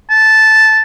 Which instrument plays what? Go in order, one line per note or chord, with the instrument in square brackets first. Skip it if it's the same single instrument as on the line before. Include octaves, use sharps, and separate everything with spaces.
[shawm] A5